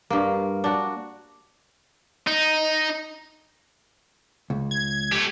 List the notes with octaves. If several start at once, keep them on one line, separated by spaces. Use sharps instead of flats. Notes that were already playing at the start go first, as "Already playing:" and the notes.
G2 A#3
D4 F#4
D#4
C#2
G#6
A3 G4